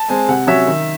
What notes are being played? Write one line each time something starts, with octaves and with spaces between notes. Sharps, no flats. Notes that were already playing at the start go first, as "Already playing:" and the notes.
Already playing: A5
G#3 C4 G#5
C3 F#5
F#3 C#4 E5
D#3